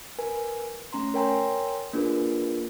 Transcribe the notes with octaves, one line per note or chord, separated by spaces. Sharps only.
A#4 B4 G#5
A3 C#4 A#5 C6
A#4 C#5 G5 G#5 A#5 C6
A#3 D4 F4 G#4 A#4 B4